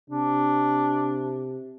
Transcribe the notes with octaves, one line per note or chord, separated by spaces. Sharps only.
C3 D4